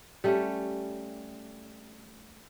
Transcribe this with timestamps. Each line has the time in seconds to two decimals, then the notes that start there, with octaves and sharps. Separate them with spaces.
0.24 G3 A3 C#4